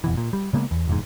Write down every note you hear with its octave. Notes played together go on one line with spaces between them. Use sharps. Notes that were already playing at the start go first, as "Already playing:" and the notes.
F1 B2 E3
A#2
G3
C#3 G#3 A#3 B3
E2
F1 E2 G#2